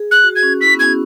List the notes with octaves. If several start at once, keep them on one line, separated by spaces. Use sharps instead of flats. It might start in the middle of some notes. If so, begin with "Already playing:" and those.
Already playing: G#4
F#6
F#4
G#6
C#4
E4 B6
C#4
B3
C#4 G#6